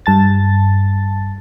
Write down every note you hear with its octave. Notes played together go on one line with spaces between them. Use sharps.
G2 A5 A6